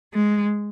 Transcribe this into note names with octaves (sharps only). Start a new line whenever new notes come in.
G#3